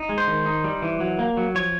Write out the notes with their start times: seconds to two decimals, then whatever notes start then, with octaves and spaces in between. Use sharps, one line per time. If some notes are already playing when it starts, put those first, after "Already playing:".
Already playing: D#4
0.09 G#3
0.18 C5
0.28 D#3
0.46 D#4
0.64 G3
0.82 E3
1.00 F#3
1.19 A#3
1.37 F#3
1.55 F3 C#5